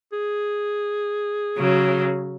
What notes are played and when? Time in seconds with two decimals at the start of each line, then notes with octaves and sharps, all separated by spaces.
0.13 G#4
1.58 C#3 F#3